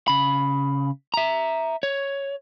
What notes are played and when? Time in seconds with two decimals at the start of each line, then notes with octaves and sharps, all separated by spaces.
0.08 C#3 B5
1.14 E5 A#5
1.83 C#5